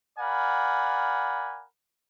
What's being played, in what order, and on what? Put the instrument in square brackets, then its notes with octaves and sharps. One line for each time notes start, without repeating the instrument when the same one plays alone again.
[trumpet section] A#4 D5 F5 F#5 G#5 B5